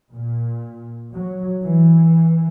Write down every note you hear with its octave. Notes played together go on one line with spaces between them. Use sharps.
A#2
F#3
E3